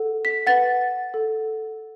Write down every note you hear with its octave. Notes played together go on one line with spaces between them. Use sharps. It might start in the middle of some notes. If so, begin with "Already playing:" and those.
Already playing: A4 F#5
B6
B4 F#5 A6
A4 F#5